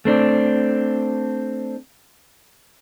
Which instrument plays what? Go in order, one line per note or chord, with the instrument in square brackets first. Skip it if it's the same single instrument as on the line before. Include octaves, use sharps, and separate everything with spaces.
[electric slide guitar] A3 C4 D4